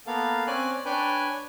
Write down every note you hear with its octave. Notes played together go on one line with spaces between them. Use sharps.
A#3 B3 A4 F5
C4 C#4 D5 G#5 F#6
D4 B4 C#5 G5 G#5